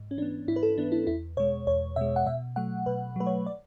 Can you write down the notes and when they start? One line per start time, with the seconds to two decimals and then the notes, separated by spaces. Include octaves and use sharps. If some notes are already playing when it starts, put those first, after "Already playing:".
Already playing: G#2
0.11 C#4
0.17 E3 D4
0.22 B3
0.48 G#2 E4
0.56 B4
0.63 A4
0.77 E3 B3 D4
0.92 E4
1.07 E2 E4
1.37 B2 G#3 C#5
1.67 E2 C#5
1.96 B2 G#3 E5
2.16 F#5
2.26 B2 E5
2.56 F#3 A3 F#5
2.86 B2 B4
3.16 F#3 A3 B4
3.27 C#5
3.46 D5